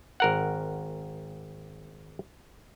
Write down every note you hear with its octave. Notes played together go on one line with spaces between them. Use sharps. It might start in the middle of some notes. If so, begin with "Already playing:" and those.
G#1 A#4 F#5